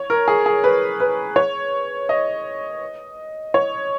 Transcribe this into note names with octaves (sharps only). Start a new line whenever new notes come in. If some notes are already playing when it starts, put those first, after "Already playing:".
Already playing: C#5
A#4
G#4
G#4
B4
B4
C#5
D#5
C#5